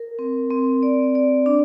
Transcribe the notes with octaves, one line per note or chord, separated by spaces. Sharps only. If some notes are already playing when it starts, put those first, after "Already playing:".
Already playing: A#4
C4
C4
D5
D5
D4